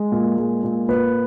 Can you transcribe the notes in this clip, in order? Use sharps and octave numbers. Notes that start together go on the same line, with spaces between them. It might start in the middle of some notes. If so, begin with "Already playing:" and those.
Already playing: G#3
A#2
G#3
A#2
A#2 B4